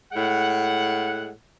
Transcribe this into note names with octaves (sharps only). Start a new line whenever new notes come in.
A2 G#3 F#5